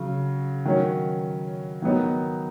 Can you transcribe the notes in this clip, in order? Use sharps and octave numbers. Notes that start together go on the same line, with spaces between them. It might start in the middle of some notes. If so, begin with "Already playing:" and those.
Already playing: C#3 F#3
D#3 F#3 C#4
D#3 F#3 B3 D#4